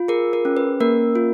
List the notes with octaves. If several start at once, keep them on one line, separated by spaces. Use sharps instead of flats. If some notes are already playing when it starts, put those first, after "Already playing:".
Already playing: F4
G#4 A#4
A#4
C#4
B4
A#3 A#4
F4